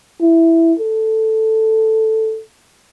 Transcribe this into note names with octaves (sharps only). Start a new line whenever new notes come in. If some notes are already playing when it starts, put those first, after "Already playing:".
E4
A4